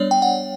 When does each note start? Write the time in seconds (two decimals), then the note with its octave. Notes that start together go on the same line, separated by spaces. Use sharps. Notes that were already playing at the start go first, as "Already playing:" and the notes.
Already playing: G3 B3 D4 C#5 D5
0.11 G5
0.22 F#5